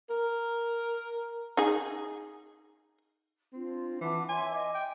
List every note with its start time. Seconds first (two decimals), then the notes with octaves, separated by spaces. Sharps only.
0.10 A#4
1.57 D#4 G#4
3.53 C4 D4 F4
4.01 E3 F#5 A5 D6
4.29 C#5 E5 G#5 C6
4.51 D#5 D6
4.74 G5